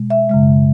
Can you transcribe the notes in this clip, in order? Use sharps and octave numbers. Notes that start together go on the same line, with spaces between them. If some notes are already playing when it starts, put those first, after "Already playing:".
Already playing: B2 G#3
E5
F#2 C#3 G#3